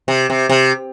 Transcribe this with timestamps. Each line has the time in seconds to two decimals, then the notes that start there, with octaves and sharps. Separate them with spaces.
0.08 C3
0.30 C3
0.49 C3